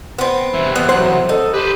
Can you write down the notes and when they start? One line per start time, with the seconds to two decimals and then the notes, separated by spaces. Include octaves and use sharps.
0.19 B3 C4
0.53 C3 E3
0.76 B3
0.89 F#3 C5 F#5
1.29 D#4 A4
1.54 G4 B4 C5